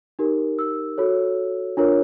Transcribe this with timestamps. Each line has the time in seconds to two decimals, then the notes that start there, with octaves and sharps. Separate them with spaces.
0.19 D#4 G4 A#4
0.59 E6
0.98 F#4 A4 C#5
1.77 D4 F4 A#4 C#5